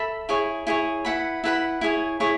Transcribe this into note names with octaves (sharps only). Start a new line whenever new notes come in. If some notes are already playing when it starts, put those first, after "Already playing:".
Already playing: A4 E5 B5
E4 G#4 C#5
E4 G#4 C#5
E4 B4 F#5 B5
E4 B4 F#5 B5
E4 G#4 C#5
E4 G#4 C#5